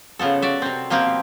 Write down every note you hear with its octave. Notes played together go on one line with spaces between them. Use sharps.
C#3 F3 B3 A4
F#4 D5 E5
C3 C4
B2 F3 A#3 C4 G4